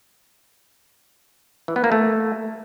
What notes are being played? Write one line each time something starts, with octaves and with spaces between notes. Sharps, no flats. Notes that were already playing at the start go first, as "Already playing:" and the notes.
E3
B3
A#3
A3